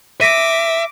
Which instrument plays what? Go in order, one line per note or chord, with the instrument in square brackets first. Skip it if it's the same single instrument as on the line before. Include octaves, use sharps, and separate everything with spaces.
[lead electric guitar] E5 [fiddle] D6 [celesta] A#6 B6 D#7